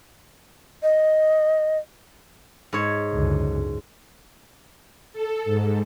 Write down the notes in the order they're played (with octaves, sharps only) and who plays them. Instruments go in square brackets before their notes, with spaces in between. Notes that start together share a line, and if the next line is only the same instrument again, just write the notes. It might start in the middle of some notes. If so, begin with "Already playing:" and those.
[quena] D#5
[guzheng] G#2 C#5
[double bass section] C#2 F#2 D3
[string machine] A4
G#2